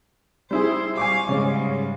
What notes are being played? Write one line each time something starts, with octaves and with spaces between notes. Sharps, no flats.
G3 E4 G#4 C5
G3 F5 G#5 C#6 D6
G#2 C#3 G3 C#4